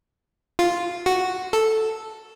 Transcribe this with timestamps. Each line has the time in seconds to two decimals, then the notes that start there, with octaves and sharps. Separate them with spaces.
0.59 F4
1.06 F#4
1.53 A4